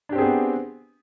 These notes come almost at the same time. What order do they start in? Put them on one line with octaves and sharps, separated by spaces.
D4 G4 C4 G#4 B3